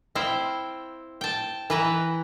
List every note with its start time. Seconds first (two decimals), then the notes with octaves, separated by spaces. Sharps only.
0.15 C4 E4 F5 G5
1.21 G5 A5
1.70 E3 B4 A#5